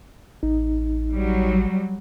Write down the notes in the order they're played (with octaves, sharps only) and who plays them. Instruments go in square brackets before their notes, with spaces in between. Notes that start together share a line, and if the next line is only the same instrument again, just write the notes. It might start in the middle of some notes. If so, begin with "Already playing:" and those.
[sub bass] A1 [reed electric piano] D#4
[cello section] F#3 G3